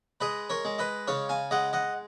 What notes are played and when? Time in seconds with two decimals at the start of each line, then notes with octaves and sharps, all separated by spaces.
0.21 G#3 B4 D#5
0.50 A#4 C#5
0.65 G#3
0.79 B4 D#5
1.07 C#3 C#5 F5
1.29 F5 G#5
1.51 G#3 D#5 F#5
1.73 D#5 F#5